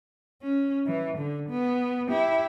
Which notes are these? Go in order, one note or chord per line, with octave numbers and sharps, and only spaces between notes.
C#4
E3
D3
B3
E4 G4